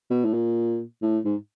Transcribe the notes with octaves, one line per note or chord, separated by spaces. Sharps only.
B2
A2
A#2
A2
G#2